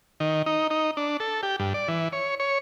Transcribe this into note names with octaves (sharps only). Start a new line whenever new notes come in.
D#3
D#4
D#4
D4
A4
G4
G2
D5
E3
C#5
C#5